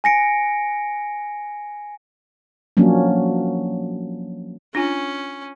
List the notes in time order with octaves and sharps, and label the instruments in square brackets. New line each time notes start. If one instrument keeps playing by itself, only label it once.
[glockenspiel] G#5 A#6 C#7 D7
[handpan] F3 F#3 A#3 C#4 D4
[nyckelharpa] C#4 [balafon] D4 F4 G#5